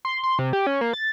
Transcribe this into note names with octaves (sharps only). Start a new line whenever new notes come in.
C6
C6
C3
G4
C#4
A#3
A6